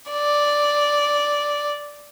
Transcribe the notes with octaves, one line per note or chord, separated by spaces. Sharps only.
D5